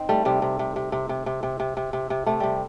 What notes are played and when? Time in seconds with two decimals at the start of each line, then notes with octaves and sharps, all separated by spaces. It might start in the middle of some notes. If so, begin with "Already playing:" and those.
Already playing: C4 D#4
0.09 G3 A3
0.25 C3 G3
0.42 C3
0.59 C3
0.76 C3
0.92 C3
1.09 C3
1.26 C3
1.43 C3
1.60 C3
1.77 C3
1.93 C3
2.10 C3
2.26 C3 A3
2.40 C3 G3